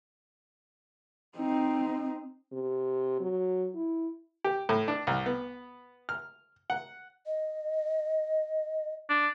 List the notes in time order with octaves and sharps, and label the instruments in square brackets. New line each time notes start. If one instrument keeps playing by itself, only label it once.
[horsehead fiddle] C4 D#4
[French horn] C3
F#3
E4
[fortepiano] G4
A2
D4
C2
B3
F6
F#5
[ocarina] D#5
[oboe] D4